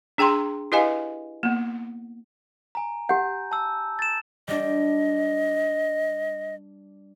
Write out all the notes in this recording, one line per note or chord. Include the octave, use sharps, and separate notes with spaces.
D4 G#4 G5 A#5 C6
E4 G4 B4 D#5 F5 G#5
A#3 B3
G#5 A#5
G4 F#5 G6
A5 E6
A6 E7
G3 D4 D#5